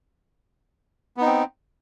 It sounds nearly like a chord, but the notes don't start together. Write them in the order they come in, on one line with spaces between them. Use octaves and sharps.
B3 D#4 C4